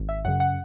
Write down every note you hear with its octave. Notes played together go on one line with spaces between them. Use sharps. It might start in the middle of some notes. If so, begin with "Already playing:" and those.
Already playing: G#1
E5
F#2 C#3 F#5
F#5